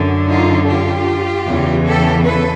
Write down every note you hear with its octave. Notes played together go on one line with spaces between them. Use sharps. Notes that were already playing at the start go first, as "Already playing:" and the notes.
Already playing: F#2 D3
D#4 F4
F4 G4
E2 C#3 E3
G4 A4
A4 B4